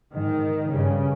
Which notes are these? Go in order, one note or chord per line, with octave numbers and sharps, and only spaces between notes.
G#2 D#3
G2 C#3